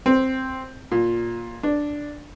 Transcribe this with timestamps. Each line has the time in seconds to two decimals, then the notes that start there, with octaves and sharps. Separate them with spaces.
0.06 C4
0.92 A#2
1.63 D4